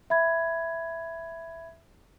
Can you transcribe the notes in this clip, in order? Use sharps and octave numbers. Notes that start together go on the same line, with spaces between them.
E5 B5 G#6